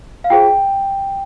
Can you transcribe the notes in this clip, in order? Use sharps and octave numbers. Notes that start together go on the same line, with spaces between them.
F5
F4 G#4 C5 G5